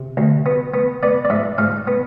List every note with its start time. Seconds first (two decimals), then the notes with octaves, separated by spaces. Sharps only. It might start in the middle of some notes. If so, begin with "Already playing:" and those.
Already playing: C3
0.17 D2
0.46 B3
0.74 B3
1.03 B3 D5
1.25 D5
1.30 G#2 E5
1.58 G#2 F5
1.87 B3